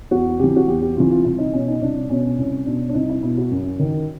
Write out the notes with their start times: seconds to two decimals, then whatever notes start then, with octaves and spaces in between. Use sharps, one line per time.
0.11 E2 F#4
0.39 C3 E3 G4
0.56 F#4
0.68 E2 G4
0.82 G4
0.97 C3 E3 F4
1.11 F4
1.24 C2 E4
1.38 D#4
1.53 B2 C#4
1.68 D#4
1.82 C2 D4
2.09 B2 C#4
2.38 C2 C#4
2.66 B2 D4
2.89 D4
2.94 C2 D#4
3.10 E4
3.23 B2 E4
3.38 F#4
3.51 F#2
3.79 D#3